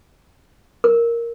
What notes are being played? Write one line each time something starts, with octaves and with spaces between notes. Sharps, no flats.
A#4